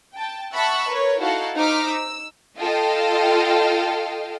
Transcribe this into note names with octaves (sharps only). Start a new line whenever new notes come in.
G5 A5
E5 F#5 A5 B5 C#6 E6
A#4 B4 C#5
D#4 E4 F#4 A4 F5 F#5
D#4 C5 A#5 D6 F6 B6
E6
F4 A4 D#5 F5 G5